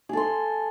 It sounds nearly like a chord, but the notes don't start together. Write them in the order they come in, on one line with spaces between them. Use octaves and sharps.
G#4 A4 C6